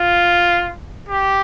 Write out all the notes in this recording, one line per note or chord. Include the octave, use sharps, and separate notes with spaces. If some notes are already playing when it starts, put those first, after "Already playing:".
Already playing: F4
G4